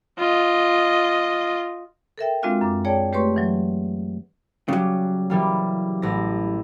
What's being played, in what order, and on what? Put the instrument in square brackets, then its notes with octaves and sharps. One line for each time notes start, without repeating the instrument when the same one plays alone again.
[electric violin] F4 D#5
[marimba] A4 A#4 E5 G5
G#3 C4 D4 F4 F#4 F5
F#2 D6
G#4 C#5 D5 G5 A5
A3 G4 B4 C#5 C6 C#6
E3 F#3
[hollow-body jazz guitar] C#3 F#3 [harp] G3
[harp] E3 G3 A#3
A1 A#6